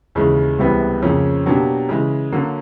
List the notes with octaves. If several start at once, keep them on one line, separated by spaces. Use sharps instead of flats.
D#2 C#3 E3 G#3
C#2 C3 E3 G3 B3
F2 C#3 F3 A#3 C#4
B2 F#3 A#3 D4 G4
C#3 E3 G#3
D3 F#3 A#3